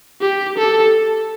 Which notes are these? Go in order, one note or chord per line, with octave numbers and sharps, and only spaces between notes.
G4
A4